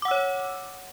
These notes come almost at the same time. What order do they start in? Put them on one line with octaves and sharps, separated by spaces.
D6 F#5 E6 C#5